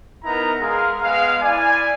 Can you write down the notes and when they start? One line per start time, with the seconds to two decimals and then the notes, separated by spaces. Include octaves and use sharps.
0.24 B3 D#4 E4 A#4 A#5
0.61 G#3 G#4 A#4 F5
1.01 G#3 B3 F5
1.41 E4 D5 G#5